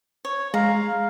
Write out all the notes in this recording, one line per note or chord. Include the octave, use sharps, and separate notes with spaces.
C#5
G#3 F5 A#5